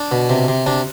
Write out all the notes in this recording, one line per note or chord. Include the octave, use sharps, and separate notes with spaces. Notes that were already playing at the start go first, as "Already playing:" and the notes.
Already playing: D4
B2
C3
C3
C3 D4